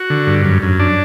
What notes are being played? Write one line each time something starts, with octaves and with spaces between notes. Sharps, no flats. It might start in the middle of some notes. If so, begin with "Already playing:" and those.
Already playing: F#4
D3
G2
F#2
F#2
D4